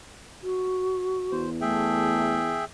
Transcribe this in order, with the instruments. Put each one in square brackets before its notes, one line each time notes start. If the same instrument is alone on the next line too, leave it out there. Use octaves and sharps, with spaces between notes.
[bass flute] F#4
[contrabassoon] E2 [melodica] C5
[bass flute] A3 [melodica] G#4 E5 G5